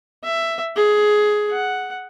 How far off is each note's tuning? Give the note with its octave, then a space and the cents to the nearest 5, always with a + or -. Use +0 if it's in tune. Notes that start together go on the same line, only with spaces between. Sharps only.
E5 +10
G#4 +15
F#5 +0